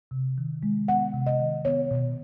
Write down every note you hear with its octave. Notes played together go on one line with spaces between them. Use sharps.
C3
D#3
G#3
B3 F#5
C3
D#5
D#3
B3 C#5
B2